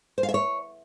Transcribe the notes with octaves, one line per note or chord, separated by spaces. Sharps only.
C5
F5
E5
C#5